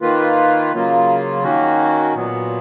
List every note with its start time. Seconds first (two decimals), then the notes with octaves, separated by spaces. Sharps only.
0.01 D#3 A#3 F4 B4
0.73 C#3 F#3 A#3 F4
1.43 D#3 A#3 C#4 F#4
2.15 A#2 F#3 B3